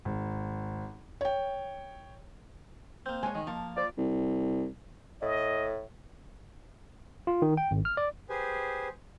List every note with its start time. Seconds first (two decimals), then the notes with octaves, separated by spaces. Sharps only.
0.05 G#1
1.21 C#5 G5
3.06 A#3 C4 G6
3.23 G#3 G#4 C#5 G#5
3.35 D#3 D#5
3.47 F3 A#3
3.77 F4 C5 D5
3.97 C2
5.22 A2 D#5
7.27 F4
7.42 D#3
7.57 G5
7.71 G#1
7.85 F6
7.97 D5
8.29 G4 G#4 B4 C5 G#5